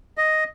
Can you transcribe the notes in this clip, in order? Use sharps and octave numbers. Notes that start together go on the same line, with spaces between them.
D#5